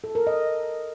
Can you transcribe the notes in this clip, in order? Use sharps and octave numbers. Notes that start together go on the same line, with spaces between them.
A4
A#4
D#5